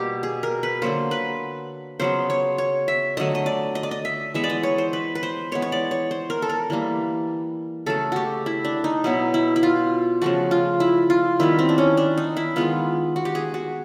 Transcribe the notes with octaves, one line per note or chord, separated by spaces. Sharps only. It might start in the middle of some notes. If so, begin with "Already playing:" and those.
Already playing: B2 G3 A#3 G4
G#4
A#4
B4
D3 F#3 A#3 C5
B4
C#3 F#3 B3 C5
C#5
C#5
E5
D3 F#3 A3 D#5
D#5
D5
D#5
D5
D#5
E5
E3 G#3 B3 E5
D5
D#5
C#5
C5
B4
B4
C5
E3 G#3 B3 C#5
C#5
D5
C#5
C5
A#4
A4
A#4
E3 G3 A#3
C#3 F#3 A3 A4
F#4 G4
E4
D4
D#4
B2 F#3 B3 E4
E4
E4
F4
C#3 F3 A3 F#4
F4
E4
F4
D#3 G3 B3 E4
C4
D4
C#4
D4
D#4
E4
D#3 G#3 B3 F4
F#4
G4
G#4
F#4